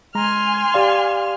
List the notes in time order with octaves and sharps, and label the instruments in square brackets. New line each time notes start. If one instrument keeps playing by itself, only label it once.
[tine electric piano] G#3 A#5 [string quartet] G#5 C6 F6
[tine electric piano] G4 D5 F5